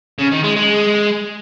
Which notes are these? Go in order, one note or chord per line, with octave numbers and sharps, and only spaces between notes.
C#3
D#3
G#3
G#3